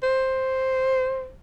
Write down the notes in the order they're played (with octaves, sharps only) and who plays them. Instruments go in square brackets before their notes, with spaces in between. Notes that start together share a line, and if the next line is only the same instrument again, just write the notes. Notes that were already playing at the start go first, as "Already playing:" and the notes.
[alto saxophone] C5